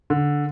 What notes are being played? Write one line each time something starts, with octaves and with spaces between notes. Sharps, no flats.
D3